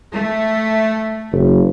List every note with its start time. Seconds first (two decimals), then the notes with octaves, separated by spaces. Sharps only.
0.13 A3
1.32 F#1